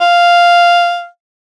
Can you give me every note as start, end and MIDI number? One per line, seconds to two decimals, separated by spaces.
0.01 1.07 77